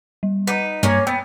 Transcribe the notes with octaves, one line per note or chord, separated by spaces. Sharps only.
G3
D#4 B4 F#5
G2 A#3 C#4 C#5 B6
B3 G5 E6 A6 D#7